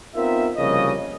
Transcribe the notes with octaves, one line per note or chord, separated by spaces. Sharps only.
B3 C4 D#4 F4 A#4 E5
C2 C#3 F3 A#3 C#5 D#5